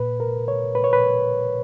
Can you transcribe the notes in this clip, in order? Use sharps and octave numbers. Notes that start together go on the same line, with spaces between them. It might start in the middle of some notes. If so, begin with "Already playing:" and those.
Already playing: A#2 B4
A#4
C#5
B4
C#5
B4